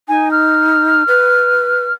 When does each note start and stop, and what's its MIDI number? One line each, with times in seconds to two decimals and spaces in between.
0.08 1.03 63
0.08 0.29 80
0.31 1.93 89
1.08 1.84 71